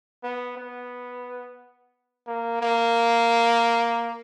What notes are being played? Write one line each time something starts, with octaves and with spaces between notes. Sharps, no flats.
B3
B3
A#3
A#3